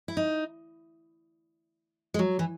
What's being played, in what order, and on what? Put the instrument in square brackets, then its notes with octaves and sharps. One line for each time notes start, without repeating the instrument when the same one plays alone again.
[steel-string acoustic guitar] E4
D#4
G#3
F#3
E3